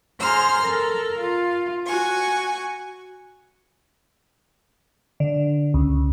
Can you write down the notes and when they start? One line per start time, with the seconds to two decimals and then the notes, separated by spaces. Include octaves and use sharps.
0.20 G#4 C5 A#5 C6 F6
0.64 A4 A#4
1.20 F4
1.86 F#4 G#5 C#6
5.20 D3
5.74 C#2